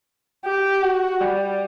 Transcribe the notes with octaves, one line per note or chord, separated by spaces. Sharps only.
G4
F#4
G3